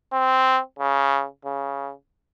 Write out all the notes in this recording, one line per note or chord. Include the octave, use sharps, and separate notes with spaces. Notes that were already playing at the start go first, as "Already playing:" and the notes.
C4
C#3
C#3